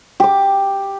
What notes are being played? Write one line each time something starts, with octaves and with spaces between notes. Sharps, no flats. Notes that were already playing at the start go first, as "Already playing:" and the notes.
G4 D6